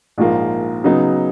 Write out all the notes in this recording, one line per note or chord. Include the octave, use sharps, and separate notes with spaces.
A#1 G#2 F3 A#3
C#3 F#3 B3 D#4